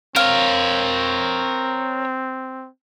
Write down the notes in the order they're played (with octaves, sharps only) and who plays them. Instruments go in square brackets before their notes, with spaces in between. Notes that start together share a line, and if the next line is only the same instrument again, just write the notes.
[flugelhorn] C4 [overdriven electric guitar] A#4 C#5 [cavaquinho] F5